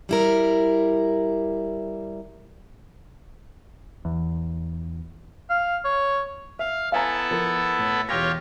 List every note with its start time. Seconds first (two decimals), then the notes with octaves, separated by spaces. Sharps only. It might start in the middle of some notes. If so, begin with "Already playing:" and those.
0.09 G3 E4 A#4
4.05 E2
5.50 F5
5.85 C#5
6.59 E5 F5
6.92 B3 E4 A4 F5 G#5 A#5
7.31 F3 A#4
7.79 A2
8.09 E1 F4 G4 C#5 A#6